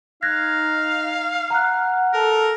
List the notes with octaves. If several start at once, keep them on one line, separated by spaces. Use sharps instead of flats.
D#4 F5 F#6 G#6 A#6
F#5 A#5 F6 F#6
A4 A#4